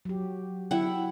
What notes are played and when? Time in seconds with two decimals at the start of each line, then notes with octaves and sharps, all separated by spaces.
0.05 F#3 G4
0.71 F#3 E4 F#5 G5